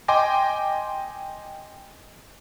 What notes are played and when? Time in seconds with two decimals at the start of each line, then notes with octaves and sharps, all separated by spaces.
0.08 D#5 G5 G#5 C6 D6 A#6